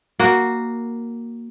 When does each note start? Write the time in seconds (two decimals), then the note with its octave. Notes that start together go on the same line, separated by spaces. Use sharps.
0.19 A#3 F#4